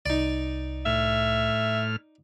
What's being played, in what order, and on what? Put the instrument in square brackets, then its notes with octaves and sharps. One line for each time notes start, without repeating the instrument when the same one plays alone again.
[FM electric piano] C2 [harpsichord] D#4 D5
[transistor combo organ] A2 F6 [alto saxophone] E5